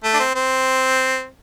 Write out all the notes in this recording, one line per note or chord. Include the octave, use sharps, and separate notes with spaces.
A3
D4
C4
C4